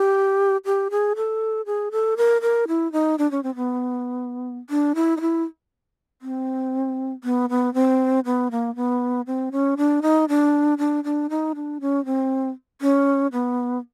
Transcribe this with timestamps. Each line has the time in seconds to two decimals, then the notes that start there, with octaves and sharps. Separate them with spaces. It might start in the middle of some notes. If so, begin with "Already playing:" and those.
Already playing: G4
0.65 G4
0.91 G#4
1.16 A4
1.66 G#4
1.92 A4
2.17 A#4
2.42 A#4
2.68 E4
2.93 D#4
3.18 D4
3.31 C#4
3.43 C4
3.56 B3
4.70 D4
4.95 E4
5.17 D#4
5.21 E4
6.22 C4
7.24 B3
7.50 B3
7.74 C4
8.25 B3
8.51 A#3
8.76 B3
9.27 C4
9.52 C#4
9.77 D4
10.02 D#4
10.29 D4
10.78 D4
11.04 D4
11.30 D#4
11.55 D4
11.81 C#4
12.06 C4
12.81 C#4
13.32 B3